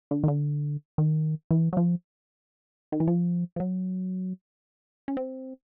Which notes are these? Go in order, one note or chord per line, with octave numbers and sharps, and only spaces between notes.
D3
D#3
D3
D#3
E3
F#3
F3
D#3
E3
F3
F3
F#3
C#4
C4